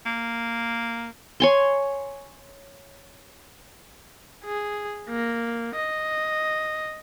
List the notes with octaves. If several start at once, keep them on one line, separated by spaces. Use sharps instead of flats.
A#3
C#5 G#5 C6
G#4
A#3
D#5